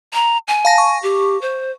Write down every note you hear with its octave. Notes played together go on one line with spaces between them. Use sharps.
A#5
G#5
F5 A5 A#6
C#6
G4
C5